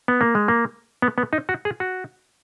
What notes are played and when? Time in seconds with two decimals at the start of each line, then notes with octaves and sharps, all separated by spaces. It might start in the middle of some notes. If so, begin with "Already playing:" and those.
0.08 B3
0.21 A#3
0.35 G#3
0.48 A#3
1.02 B3
1.18 B3
1.33 D#4
1.49 F#4
1.65 G#4
1.80 F#4